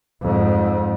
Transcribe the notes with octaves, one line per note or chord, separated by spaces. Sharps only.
F2 G#2